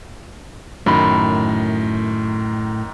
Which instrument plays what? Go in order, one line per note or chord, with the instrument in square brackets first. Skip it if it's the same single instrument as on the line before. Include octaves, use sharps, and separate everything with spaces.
[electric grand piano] F#2 D#3 [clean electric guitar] A2 B5